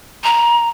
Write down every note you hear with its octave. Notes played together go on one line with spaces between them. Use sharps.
A#5